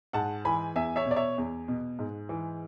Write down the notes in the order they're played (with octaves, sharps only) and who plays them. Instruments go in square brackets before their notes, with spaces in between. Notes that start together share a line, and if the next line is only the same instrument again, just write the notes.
[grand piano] G#2 F#5 A5
E3 G#5 B5
E2 E5 G#5
C#5 E5
B2
D5
C#5 E5
E2
B2
G#2
E3